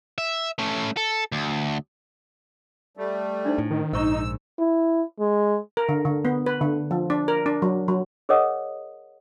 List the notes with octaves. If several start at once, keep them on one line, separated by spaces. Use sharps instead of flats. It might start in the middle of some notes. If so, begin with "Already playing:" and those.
E5
A3 C#4
A4
D2
G3 A3
D4 D#4 C5
A2
D#3
A#1 G#2 D#4 C5 C#6 E6
E4
G#3
A#4
D3
D3
B3
B4
D3
F3
D4
A#4
D4
F#3
F#3
G#4 A#4 C#5 D#5 F#5 D#6